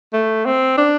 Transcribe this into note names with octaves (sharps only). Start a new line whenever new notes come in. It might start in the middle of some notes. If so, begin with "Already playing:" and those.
A3
C4
D4